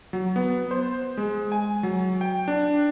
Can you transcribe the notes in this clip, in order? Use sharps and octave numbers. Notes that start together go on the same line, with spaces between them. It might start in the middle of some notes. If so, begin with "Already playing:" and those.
F#3
B3
C5
G#3
G#5
F#3
G5
D4